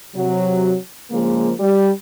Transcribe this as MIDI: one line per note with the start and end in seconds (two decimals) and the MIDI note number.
0.16 0.76 48
0.16 0.76 54
1.12 1.52 49
1.12 1.52 53
1.12 1.52 56
1.12 1.52 58
1.60 1.90 55